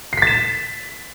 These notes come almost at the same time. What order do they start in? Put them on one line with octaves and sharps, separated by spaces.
C7 B6 A6 E7